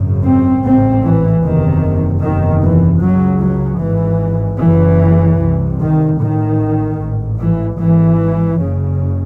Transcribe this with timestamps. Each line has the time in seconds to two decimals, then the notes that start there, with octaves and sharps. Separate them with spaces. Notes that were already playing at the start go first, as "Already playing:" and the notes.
Already playing: G#1 F#2 C#3
0.24 C4
0.64 A1 G#2 C4
1.04 E3
1.44 F#1 E2 C3 D#3
2.23 F#1 E2 C3 D#3
2.63 E3
3.02 C#2 C#3 F#3
3.42 F#3
3.81 G#1 G#2 E3
4.61 F#1 F#2 C#3 E3
5.40 C2 C3
5.81 D#3
6.19 A1 A2 D#3
6.99 A1 G#2
7.40 E3
7.78 G#1 G#2 E3
8.58 F#1 F#2 C#3